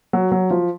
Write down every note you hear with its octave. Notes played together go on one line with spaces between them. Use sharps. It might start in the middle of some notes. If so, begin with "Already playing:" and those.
F#3
F#3
F3